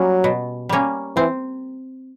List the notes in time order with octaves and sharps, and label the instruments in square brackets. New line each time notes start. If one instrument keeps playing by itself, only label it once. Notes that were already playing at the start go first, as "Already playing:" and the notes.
Already playing: [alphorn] F#3 [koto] G3 A#3 C#4
[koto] B2
G3 A#3 C#4
[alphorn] E3 [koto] C4